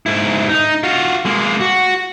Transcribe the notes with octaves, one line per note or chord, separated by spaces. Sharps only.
G#2 E4
D#4
F4 F#4
G#3 A#3
F#4